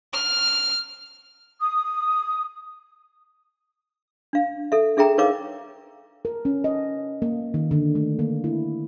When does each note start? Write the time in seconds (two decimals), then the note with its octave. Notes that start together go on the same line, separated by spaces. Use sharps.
0.13 F6
1.60 D#6
4.33 D4 F5
4.72 A4 E5
4.97 D4 G#4 E5 G5 A#5
5.18 D#4 A#4 B4 C#5 F5 D6
6.25 A#4
6.45 C#4
6.64 D#5
7.22 A#3
7.54 D#3
7.71 D3
7.95 A3
8.19 A#3
8.44 E4